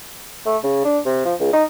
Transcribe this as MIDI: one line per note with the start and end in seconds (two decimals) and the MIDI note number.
0.46 0.57 57
0.64 0.84 49
0.85 0.98 62
1.05 1.22 48
1.25 1.34 53
1.40 1.53 37
1.53 1.64 63